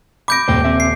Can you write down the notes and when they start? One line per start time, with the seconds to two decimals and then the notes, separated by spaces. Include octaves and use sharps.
0.28 B5 D6 G6 A#6 D7
0.48 D#1 G#2 C5 G5
0.64 C4 E5
0.80 C7